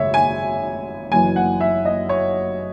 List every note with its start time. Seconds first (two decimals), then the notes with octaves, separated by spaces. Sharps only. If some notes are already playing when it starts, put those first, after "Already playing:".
Already playing: G#1 F#2 C#3 C#5 E5
0.14 G#5
1.11 F#1 F#2 E3 G#5
1.36 F#5
1.61 E5
1.85 D#5
2.09 C#5